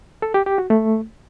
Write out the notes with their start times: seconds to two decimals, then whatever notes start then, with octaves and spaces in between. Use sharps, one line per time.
0.22 A4
0.34 G4
0.46 G4
0.58 F#4
0.70 A3